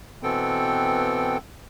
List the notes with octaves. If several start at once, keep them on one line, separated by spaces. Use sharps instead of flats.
B2 E3 B3 C4 A4 G5